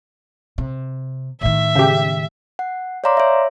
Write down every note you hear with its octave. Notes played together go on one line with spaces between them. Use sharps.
C3
A2 D#3 E5
C#3 G4
F#5
C#5 D5 F5 A#5 C6 D6
C#5 E5